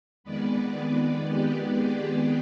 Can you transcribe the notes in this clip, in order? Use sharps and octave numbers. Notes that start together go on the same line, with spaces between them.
F2 D#3 G#3 B3 B4 D5
G4 B4
G#4